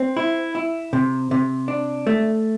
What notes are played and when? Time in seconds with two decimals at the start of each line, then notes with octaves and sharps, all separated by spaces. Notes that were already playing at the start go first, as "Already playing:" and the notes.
Already playing: C4
0.17 E4
0.55 E4
0.93 C3
1.31 C3
1.68 D4
2.07 A3